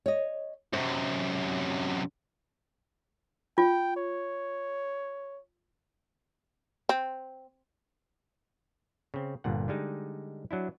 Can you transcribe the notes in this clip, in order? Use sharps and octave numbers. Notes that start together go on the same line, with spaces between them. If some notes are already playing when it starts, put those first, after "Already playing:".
C#5 D#5
F#2 C3 C5
F4 G5
C#5
C4
C#3 C4
G1 G2 A#2 F#5
D3 G3 G#3 D#4
F#3 D4 E4